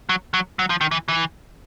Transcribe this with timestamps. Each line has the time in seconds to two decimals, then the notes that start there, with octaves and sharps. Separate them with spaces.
0.09 F#3
0.34 F#3
0.59 F#3
0.70 F3
0.81 D#3
0.91 E3
1.08 E3